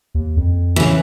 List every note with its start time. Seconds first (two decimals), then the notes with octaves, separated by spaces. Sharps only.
0.15 D#2
0.37 F2
0.76 C#3 E3